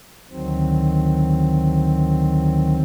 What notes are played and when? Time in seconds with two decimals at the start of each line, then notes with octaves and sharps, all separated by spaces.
0.30 D2 D#3 F#3 C4